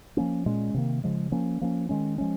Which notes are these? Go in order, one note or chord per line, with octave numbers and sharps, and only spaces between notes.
F3 A#3 C#4
A#2 G#3 C#4
C3 D#3 A#3
C#3 F3 G#3
F3 A#3 C#4
F3 A#3 C#4
D#3 G#3 C#4
F3 G#3 C#4